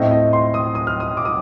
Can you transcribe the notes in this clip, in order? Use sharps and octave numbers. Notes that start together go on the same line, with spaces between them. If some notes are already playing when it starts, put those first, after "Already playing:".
Already playing: A2 A3 C4 D#5
D#5
C6
D#6
D#6
F6
D#6
D6
D#6